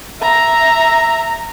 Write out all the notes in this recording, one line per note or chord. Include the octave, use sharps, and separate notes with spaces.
E5 A#5